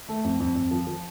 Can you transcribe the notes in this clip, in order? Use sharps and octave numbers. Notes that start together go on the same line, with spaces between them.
A3
F2
F2
F2
F3
F3